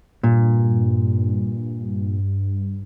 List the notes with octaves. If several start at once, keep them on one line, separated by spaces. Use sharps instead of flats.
G2 A#2